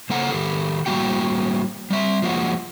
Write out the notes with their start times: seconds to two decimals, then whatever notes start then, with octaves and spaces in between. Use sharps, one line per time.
0.10 C#3 A#3 A4 F#5 A#5
0.31 D#3 G4 A4
0.86 A2 G3 A#3 F#4 G5
1.90 G3 E5
2.22 F3 G#3 A#3 F4 F#4